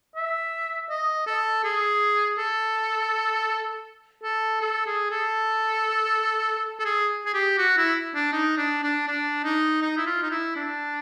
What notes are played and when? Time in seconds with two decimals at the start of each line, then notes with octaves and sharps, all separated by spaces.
0.16 E5
0.89 D#5
1.26 A4
1.64 G#4
2.38 A4
4.23 A4
4.61 A4
4.86 G#4
5.10 A4
6.80 A4
6.85 G#4
7.26 G#4
7.34 G4
7.58 F#4
7.77 E4
8.15 D4
8.33 D#4
8.57 D4
8.83 D4
9.08 D4
9.44 D#4
9.82 D#4
9.97 E4
10.07 F4
10.22 D#4
10.31 E4
10.56 D4